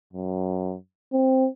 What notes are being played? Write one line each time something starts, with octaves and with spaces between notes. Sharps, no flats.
F#2
C4